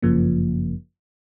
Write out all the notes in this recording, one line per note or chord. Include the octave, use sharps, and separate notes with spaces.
G1 F#2 C#3 F3 A#3